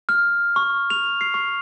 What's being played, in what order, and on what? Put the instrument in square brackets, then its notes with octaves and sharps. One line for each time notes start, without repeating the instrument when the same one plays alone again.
[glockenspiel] F6
C#6
F7
C7
C#6